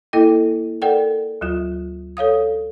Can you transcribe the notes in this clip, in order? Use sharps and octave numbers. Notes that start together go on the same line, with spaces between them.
A#3 E4 A4 D#5 G5
A4 A#4 D5 F#5 G5
D2 F#3 F4
A4 C#5 F5 D#6